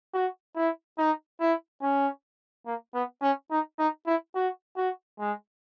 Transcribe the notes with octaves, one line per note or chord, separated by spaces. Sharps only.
F#4
E4
D#4
E4
C#4
A#3
B3
C#4
D#4
D#4
E4
F#4
F#4
G#3